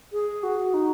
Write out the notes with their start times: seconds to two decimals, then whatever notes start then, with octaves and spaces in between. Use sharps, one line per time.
0.13 G#4
0.43 F#4
0.74 D#4